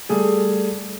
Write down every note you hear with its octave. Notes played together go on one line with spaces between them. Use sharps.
G3 A3 G#4